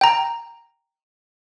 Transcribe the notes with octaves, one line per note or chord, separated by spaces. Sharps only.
G5 A#5